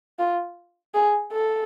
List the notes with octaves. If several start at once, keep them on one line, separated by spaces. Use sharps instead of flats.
F4
G#4
A4